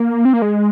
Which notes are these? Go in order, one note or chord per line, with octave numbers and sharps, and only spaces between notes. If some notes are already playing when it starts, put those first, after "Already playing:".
Already playing: A#3
C4
A#3
G#3